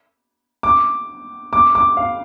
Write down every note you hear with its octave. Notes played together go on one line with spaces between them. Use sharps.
D6
D6
D6
F5